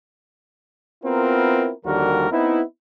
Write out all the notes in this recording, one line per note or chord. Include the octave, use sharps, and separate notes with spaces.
B3 C4 E4 F4 A#4
D#2 D3 F3 G3 F#4 A#4
B3 C4 D#4 E4